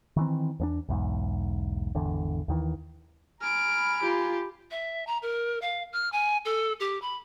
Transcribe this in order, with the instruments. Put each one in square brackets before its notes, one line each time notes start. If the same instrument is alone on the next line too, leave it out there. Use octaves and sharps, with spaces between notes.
[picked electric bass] D#3 E3 C4
E2 B3 D4
B1 E2 G#2
G#1 E2 D3
D#2 D#3 E3
[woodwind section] G#5 A#5 B5 [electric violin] F6 D7
[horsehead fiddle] F4 [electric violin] G4
[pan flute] E5
A#5
A#4
F5
F6
G#5
A4
G4
B5